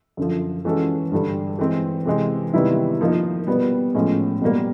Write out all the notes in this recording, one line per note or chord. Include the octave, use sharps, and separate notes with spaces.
F#2 D3 F3
E3 G#3 C#4 F#4 A4
G2 D3 G3
E3 G#3 C4
C3 E3 G#3 C4
C3 D#3 G3 B3 E4
F3 A#3 D#4
B2 G3 B3
A2 F3 G#3 C#4
B2 G3 A#3